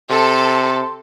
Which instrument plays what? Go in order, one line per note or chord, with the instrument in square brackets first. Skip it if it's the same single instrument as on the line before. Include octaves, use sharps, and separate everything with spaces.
[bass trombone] C3 [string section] A4 [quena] C6